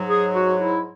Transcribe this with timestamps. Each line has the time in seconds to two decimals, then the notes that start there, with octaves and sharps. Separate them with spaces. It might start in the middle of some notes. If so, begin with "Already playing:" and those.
Already playing: G#2 F#3
0.08 G#4
0.35 F#4
0.61 E4